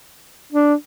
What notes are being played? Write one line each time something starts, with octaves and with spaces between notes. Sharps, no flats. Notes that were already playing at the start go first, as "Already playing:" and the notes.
D4